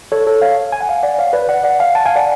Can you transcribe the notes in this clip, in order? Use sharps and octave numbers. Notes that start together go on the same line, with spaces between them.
A4 C#5
A4 C#5
C#5 F5
G#5
F#5
F5 G#5
D5 F#5
C#5 F5
B4 D5
D5 F#5
D5 F#5
F5 G#5
F#5 A5
F5 G#5
D5 F#5